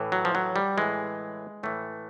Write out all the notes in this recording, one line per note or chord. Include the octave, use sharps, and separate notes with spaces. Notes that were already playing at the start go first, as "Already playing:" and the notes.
Already playing: A2 E3
F#3
F3
F#3
G3
A2 E3 G#3
A2 E3 A3